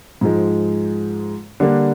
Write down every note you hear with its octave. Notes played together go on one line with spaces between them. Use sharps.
G#2 F3 G#3
D3 G3 A#3 D4